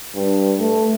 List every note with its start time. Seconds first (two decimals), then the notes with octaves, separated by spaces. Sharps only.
0.15 G2
0.59 A3